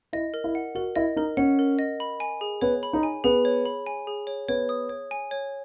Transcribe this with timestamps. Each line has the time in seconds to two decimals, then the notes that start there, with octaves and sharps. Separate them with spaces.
0.13 E4 D#5
0.34 A#4
0.44 E4
0.55 F#5
0.75 F#4 A#4
0.96 E4 D#5
1.16 D#4 A#4
1.37 C#4 F#5
1.59 A#4
1.79 D#5
2.00 B5
2.20 G#5
2.41 G#4
2.61 B3 C#5
2.83 B5
2.93 D#4
3.03 G#5
3.24 B3 G#4
3.45 C#5
3.65 B5
3.86 G#5
4.07 G#4
4.27 C#5
4.49 B3 C#5
4.69 D#6
4.90 C#5
5.11 G#5
5.31 C#5